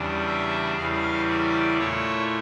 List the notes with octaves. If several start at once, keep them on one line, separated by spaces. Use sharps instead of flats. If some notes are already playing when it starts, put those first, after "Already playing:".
Already playing: E2 C#3 G3 D4
E5
E2 C#3 E3 G3 F5
D5
A#2 A3 E4 C#5